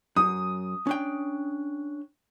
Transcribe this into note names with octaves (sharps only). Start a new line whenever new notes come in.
F#2 D#6
C#4 D4 G5